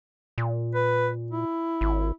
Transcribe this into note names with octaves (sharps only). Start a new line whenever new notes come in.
A#2
B4
E4
G#1